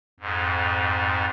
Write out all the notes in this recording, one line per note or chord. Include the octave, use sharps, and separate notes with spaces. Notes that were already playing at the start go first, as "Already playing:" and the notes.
F2 G#2